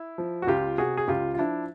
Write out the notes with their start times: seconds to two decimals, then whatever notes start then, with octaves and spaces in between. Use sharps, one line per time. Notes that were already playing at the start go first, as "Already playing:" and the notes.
Already playing: E4
0.18 F3
0.42 F#4
0.47 C#2 F4 G4
0.78 C3 F#4 G#4
0.97 G#4
1.08 C#2 F4 G4
1.34 F4
1.38 F3 D4 E4